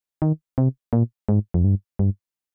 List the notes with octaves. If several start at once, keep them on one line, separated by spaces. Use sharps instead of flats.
D#3
C3
A#2
G#2
F2
G2
G2